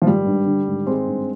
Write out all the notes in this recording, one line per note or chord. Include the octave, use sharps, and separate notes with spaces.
F3
G#1 G3
G2
D3
G#1
G#1 G#3 C4
G2